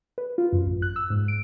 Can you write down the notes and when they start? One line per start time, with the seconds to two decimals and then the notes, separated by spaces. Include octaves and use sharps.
0.18 B4
0.38 F4
0.53 F#2
0.65 A1
0.82 F#6
0.96 E6
1.10 G#2
1.28 D7